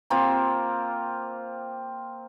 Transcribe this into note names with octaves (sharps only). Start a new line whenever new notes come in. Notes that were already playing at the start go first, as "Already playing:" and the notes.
A#3 C4 F4